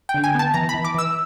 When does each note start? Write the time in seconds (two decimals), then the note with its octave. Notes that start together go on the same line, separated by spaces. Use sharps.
0.09 G5
0.14 D3
0.24 G#5
0.35 B3 A5
0.54 E3 A#5
0.69 B5
0.74 E3
0.84 D6
0.94 E3 E6